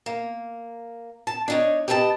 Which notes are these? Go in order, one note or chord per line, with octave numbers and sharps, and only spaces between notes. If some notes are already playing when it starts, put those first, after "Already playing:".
A#3
A5
D4 D#4 C#5
G4 B4 D#5 E5 A5